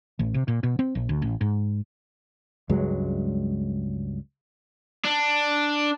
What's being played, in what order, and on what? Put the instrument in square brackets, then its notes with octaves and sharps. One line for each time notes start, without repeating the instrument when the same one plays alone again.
[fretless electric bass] A1
C3
A#2
B2
C4
A#1
D2
A1
G#2
C#2 G2 F#3 G#3
[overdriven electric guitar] D4